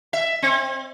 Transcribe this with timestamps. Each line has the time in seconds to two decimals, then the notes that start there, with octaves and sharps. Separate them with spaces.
0.13 E5
0.42 C4